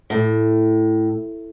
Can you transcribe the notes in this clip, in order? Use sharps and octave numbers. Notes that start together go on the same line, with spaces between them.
A2